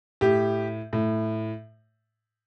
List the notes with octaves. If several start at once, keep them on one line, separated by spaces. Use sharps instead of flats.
A2 G4
A2